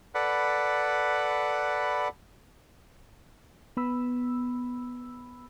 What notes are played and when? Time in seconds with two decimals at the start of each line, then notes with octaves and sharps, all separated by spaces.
0.15 A4 B4 D5 F#5 B5
3.77 B3 B5 E6